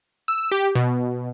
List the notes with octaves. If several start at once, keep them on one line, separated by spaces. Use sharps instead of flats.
E6
G4
B2